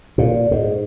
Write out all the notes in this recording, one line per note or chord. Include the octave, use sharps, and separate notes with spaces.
A#2
G#2